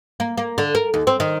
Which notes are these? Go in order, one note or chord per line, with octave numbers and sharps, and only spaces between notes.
A#3
A#3
D3
A#4
D#2
C4
D#3